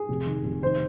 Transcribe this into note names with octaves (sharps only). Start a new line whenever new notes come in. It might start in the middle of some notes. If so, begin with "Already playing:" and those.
Already playing: G#4
F1
D#3
F1
D#3 C5